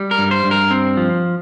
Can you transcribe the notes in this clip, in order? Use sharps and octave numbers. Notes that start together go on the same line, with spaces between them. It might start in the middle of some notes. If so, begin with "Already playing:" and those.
Already playing: G3
A#4
G2
C5
G2
A#4
C4
F3